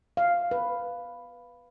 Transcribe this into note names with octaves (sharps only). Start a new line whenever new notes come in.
F5
B4